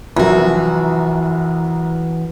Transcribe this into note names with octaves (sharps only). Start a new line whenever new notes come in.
C2 F#2 E3 F3 F#4